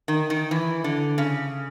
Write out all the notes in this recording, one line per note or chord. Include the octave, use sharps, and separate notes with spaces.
D#3
D#3
E3
D3
C#3